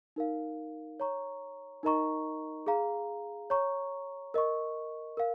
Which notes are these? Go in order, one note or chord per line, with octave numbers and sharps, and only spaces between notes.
D#4 A#4 F5
C#5 A#5 C#6
D#4 A#4 D#5 A#5 C#6
G#4 F5 A#5
C#5 A#5 C#6
A#4 D#5 C#6
A#4 F5